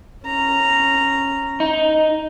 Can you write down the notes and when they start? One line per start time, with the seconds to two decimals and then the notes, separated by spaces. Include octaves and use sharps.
0.25 C#4 A#5
1.60 D#4